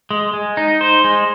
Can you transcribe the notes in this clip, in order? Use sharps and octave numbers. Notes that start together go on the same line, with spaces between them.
G#3
G#3
D#4
C5
G#3